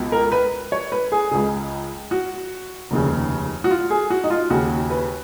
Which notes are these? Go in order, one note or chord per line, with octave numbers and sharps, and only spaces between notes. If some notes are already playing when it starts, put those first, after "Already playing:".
Already playing: C#2 B2
A#4
B4
C#5
B4
G#4
C#2 C#3 G#4
F#4
F1 D#2 C#3
F#4
F4
G#4
F#4
D#4
F4
D#2 C#3 F#4
B4